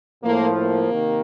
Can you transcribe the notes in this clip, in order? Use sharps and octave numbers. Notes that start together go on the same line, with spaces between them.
A2 F3 A#3
A#3
C3 D#3